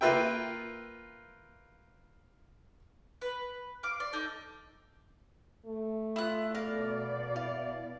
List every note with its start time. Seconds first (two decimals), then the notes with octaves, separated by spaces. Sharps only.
0.01 A#3 F4 B4 E5 G5
3.21 B4
3.83 F5 D6
4.00 D5
4.13 D#4 A4
5.66 A3
6.16 E4 F4 F#6
6.55 B2 A#4 D5 F5
7.36 E4 F5